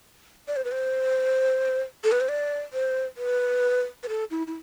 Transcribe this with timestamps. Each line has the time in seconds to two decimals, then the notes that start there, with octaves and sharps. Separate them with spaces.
0.48 D5
0.56 C5
0.65 B4
0.72 C5
2.04 A4
2.12 B4
2.20 C5
2.29 D5
2.73 C5
3.17 B4
4.03 B4
4.09 A4
4.31 E4
4.47 E4